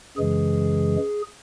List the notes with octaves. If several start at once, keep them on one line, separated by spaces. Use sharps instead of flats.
F#2 C#3 E3 G#3 G#4